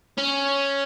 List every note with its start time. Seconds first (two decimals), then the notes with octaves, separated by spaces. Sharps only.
0.18 C#4